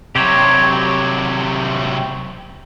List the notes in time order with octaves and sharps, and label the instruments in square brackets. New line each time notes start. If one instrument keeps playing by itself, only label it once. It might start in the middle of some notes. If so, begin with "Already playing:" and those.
[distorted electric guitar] C3 F#3 [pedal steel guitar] G4 C5 C#5